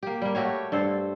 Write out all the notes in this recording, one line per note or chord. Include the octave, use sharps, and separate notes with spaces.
A#3 G4
G3 A#3
A3 F#4 G4 C#5
G2 A4 C5